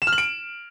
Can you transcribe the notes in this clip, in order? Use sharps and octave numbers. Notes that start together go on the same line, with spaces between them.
E7
F6
F#7
D7